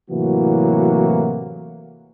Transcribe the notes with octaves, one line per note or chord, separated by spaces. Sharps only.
A2 C3 E3 F#3 A#3 F#4